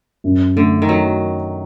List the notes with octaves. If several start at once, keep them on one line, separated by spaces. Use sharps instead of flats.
F#2
D3 A3
D#3
F#3